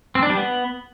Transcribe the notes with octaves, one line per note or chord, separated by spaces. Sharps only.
C4
D4
G3
B3